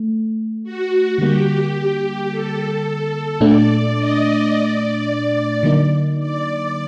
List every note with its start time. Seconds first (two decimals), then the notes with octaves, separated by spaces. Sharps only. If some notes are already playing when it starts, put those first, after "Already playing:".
Already playing: A3
0.63 F#4
1.18 D3 G3 A#3 G4
2.31 A4
3.40 A#2 A3 D4 D5
3.97 D#5
4.52 D5
5.63 D3 F#3 A#3 D#4
6.19 D5